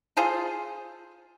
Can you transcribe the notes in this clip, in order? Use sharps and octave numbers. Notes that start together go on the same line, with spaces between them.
F4 G#4 A4 C5